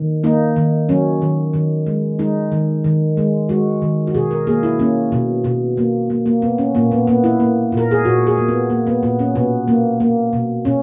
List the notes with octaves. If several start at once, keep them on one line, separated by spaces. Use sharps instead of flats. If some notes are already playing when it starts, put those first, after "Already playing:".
Already playing: D#3
A#3 D#4
D#3
F#3 C#4
D#3
D#3
G#3
G#3 D#4
D#3
D#3
G#3
G#3 F#4
D#3
F#4
B2 G#4
A#4
A#3 G#4
E4
A#3 C#4
B2
B2
A#3
A#3
A#3
B2 B3
C#4
A#2 A#3
B3
A#3 B3
E4
A#3
A#2 A#4
G#4
A#2 F#4
G#4
A#3
B3
A#3
B3
A#2 B3
C#4
B2 B3
A#3
A#3
B2
B2 C#4